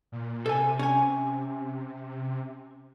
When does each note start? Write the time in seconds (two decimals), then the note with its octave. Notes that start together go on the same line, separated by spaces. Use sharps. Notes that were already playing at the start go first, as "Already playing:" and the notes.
0.12 A#2
0.46 C3 A4 G#5
0.79 C#4 G#5